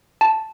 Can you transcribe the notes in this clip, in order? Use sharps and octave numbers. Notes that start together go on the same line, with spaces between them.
A5